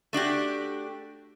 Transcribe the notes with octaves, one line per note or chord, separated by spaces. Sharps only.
A3 D4 F#4 G4